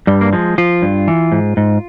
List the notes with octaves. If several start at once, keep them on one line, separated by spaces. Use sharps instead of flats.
G2 G3
A#3
F3 G#3
F3 F4
G2
E3
G#2
G#2